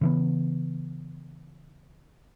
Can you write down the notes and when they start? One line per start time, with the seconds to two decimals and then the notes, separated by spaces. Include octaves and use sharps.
0.01 C#3 E3 B3